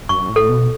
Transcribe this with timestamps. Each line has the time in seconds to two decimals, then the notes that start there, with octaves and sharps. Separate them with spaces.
0.09 F#2 C#6
0.29 A2
0.36 A4
0.49 B2